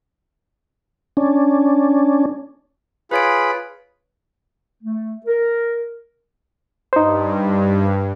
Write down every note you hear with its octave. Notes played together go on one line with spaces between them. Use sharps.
C#4 D4
F4 G#4 B4 C#5 B5 D7
A3
A#4
G2 D#4 C5